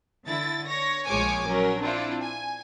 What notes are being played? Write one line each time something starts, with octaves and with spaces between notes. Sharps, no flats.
D3 E4 A6
C#5 A#6
A#1 F3 G#3 C#5 G#5 D6
F#3 C#4 A#4
C4 D4 E4 F4
G#5